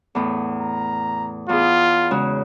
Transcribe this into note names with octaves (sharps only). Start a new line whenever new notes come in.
E2 A2
A#5
E2 F4 G#4
C#3 G#3 F#4